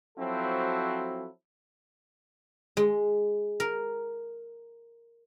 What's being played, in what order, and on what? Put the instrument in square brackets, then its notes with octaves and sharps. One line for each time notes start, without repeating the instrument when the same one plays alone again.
[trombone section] F3 F#3 C4 E4 F#4 A4
[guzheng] G#3
A#4